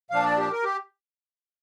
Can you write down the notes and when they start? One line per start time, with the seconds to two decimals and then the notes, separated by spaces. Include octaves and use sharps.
0.11 A#2 F3 D4 F5
0.24 D5
0.38 G4
0.52 A#4
0.64 G4